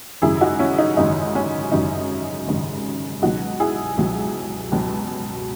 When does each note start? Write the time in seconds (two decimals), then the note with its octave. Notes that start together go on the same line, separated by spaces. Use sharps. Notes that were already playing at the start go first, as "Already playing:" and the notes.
0.22 G#1 F#2 C#3 E4 G#4
0.41 D#4 F#4
0.59 C#4 E4
0.78 D#4
0.97 G#1 F#2 C#3 D#4
1.35 C#4
1.72 G#1 F#2 C#3 D#4
2.48 G#1 F#2 C#3
3.22 C#2 B2 F#3 D#4 F#4
3.60 E4 G#4
3.97 C#2 B2 F#3
4.72 C#2 B2 F#3